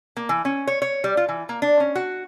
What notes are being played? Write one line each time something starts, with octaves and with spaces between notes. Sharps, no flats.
A#3
E3
C#4
C#5
C#5
G3
F4
E3
A#3
D4
C#4
F#4